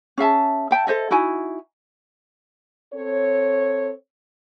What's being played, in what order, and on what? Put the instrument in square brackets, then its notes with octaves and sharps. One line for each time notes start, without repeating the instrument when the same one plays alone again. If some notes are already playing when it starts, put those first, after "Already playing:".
[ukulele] C#4 G#4 E5 A5
E5 G5 A5
A4 C5 D#5 E5
D#4 E4 F#4 G#5
[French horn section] C4 A4 C#5